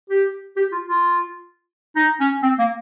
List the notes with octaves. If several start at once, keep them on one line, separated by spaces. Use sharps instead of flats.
G4
G4
F4
F4
D#4
C#4
C4
A#3